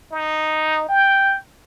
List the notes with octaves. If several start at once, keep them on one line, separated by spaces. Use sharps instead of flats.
D#4
G5